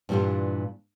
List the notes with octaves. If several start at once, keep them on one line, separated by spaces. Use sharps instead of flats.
G2 A#2 E3 G3 D4 F4